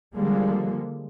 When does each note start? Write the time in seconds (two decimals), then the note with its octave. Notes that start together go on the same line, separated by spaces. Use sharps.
0.14 D3 F3 G3 G#3 A#3